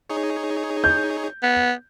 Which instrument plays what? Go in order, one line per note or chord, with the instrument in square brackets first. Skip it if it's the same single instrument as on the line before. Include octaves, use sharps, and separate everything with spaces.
[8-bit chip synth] D#4 G#4 C#5
[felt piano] G6
[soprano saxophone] B3